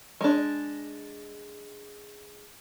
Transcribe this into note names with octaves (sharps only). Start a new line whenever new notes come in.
G#3 D4